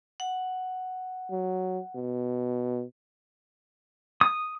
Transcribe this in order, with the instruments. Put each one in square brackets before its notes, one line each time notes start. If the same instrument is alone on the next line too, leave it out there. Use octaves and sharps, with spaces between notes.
[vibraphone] F#5
[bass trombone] F#3
B2
[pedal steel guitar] D#6